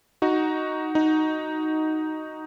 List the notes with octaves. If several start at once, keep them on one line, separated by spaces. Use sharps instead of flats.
D#4 F#4
D#4